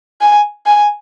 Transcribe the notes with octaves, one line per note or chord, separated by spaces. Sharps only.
G#5
G#5